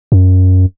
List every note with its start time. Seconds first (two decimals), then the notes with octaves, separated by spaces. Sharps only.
0.12 F#2